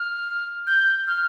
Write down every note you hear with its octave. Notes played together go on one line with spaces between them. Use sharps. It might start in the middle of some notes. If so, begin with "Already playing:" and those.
Already playing: F6
G6
F6